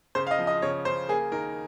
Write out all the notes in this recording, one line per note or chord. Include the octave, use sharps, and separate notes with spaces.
C#3 C5
F5
D#5
F3
D#5
C#3 C#5
C#3 C5
A#3 G#4
D#3 A#4